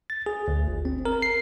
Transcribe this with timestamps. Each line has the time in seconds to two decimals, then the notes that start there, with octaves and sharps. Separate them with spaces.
0.10 A6
0.26 G#4
0.48 D2
0.68 G1
0.85 C4
1.05 A#4
1.22 C7